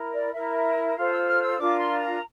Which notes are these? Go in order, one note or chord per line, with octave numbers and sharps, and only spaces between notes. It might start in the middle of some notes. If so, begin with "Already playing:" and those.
Already playing: E4 A#4
D5
E4 A#4 E5
F4 A4 C5 F5
E6
F6
E6
D4 F4 A#4 D6
C6
A#5